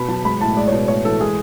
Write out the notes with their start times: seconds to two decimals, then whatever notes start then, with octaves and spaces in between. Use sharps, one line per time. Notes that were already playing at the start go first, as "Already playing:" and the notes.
Already playing: B2 B5
0.08 F#3 A5
0.24 G#3 B5
0.41 A2 A5
0.57 G#3 D5
0.68 B2 C#5
0.88 A2 C#5
1.04 E3 A4
1.20 G#3 G#4